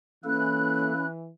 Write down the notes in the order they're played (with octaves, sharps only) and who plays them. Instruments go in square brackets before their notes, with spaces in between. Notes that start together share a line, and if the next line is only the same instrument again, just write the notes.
[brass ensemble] E3 [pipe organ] A#3 A4 [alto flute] C#4 [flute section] B5 F#6